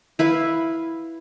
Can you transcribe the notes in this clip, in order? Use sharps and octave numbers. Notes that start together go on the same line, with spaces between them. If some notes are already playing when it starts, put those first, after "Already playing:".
E4 B4 F5